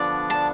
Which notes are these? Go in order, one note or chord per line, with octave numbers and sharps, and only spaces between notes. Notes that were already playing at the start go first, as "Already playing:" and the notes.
Already playing: D3 F3 B3 D4 D5
A5